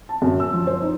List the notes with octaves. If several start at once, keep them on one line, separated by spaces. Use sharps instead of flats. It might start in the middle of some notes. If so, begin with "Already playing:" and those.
A5
F#2
E6
F3
C5
D#4